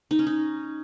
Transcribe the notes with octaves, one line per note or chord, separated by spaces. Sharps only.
D#4
C#4
D#4